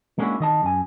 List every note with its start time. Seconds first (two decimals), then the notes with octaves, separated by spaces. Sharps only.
0.19 G#3 A#3 C#4 D4 E4 F#4
0.40 D#3 D#5 A5
0.63 F#2 G#5